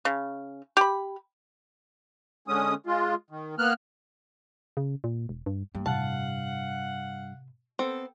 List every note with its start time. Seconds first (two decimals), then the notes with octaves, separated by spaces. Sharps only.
0.05 C#3
0.77 G4 B5
2.48 D3 G#3 C#4 D#6
2.86 G#3 F4
3.30 D#3
3.58 A#3 B3 F6 F#6
4.77 C#3
5.04 A#2
5.29 E1
5.46 G2
5.75 G2 A#3
5.86 A2 C3 F5 F#5 A5
7.79 B3 C4 A4